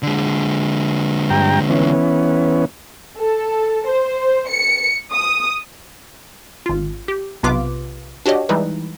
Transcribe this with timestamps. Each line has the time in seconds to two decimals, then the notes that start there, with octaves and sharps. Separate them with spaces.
0.03 D3 G#3
1.30 G2 G5 A#5
1.70 E3 B3 C#4
3.19 A4
3.87 C5
4.49 C#7
5.13 D#6
6.66 G#1 F4
7.08 G4
7.43 B1 C3 B3 F4 B4 D6
8.26 D4 F#4 G4 C#5 D#5
8.49 E3 G3 G#3 D#4 E4 B4